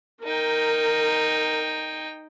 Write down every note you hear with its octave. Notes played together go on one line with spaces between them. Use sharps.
D#4 A#4 G5